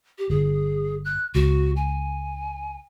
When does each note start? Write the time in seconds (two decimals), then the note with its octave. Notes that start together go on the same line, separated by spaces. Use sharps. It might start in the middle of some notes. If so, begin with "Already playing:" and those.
0.18 G4
0.30 G1 G#4
1.05 F#6
1.35 C#2 F#4
1.76 G#5